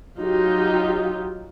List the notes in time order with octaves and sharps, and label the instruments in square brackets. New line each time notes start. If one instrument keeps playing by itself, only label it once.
[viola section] F#3 D#4 F4 G4